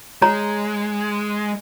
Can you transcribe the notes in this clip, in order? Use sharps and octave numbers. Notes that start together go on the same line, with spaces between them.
G#3 C#5 A#5